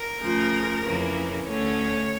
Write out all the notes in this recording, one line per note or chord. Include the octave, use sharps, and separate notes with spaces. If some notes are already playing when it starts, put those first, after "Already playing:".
Already playing: A#4
D2 C#3 F3
F2 C#3 E3 A#3
D2 D3 A3 C#4 C#5